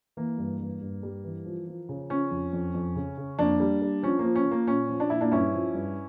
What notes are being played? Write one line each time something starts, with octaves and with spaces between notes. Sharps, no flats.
E3 A#3
G2
G2
G2
G3
E3
F3
F3
C#3
F3 C#4
F2
F2
F2
C#3
C#3
F2 A#3 D4
G3
G3
F3 C#4
A#3
F3
C#4
F3
A#3
A#2 C#4
F3
D4
A#2 E4
A#3 D4
G2 C#4 E4
F3
G2